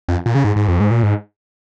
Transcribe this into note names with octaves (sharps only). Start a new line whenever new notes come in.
F2
A#2
C#3
G#2
G#2
F2
G#2
A#2
G#2